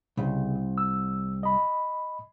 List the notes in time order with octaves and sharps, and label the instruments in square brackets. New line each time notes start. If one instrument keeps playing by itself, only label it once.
[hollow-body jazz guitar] C2 [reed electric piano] C#3
[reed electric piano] E6
D#5 B5